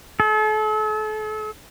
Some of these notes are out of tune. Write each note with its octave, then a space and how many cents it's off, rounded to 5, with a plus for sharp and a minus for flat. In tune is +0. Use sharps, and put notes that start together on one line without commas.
A4 -40